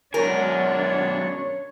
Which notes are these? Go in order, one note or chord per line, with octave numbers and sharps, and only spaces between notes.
F#2 B2 G#3 D4 A#4 C#5 G#5